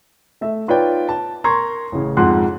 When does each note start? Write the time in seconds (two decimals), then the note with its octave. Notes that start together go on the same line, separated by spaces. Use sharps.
0.41 A3 E5
0.68 D#4 F4 B4 C#5 D5 G5
1.09 A5
1.44 A#4 A#5 C6 C#6 G#6
1.92 A1 C#3
2.17 F2 G#2 F#5 C6 F#6